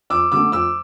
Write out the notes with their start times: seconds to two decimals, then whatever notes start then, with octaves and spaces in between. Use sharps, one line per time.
0.10 F2 D6 E6
0.32 D3 F#3 A3 D6 E6
0.52 F2 D6 E6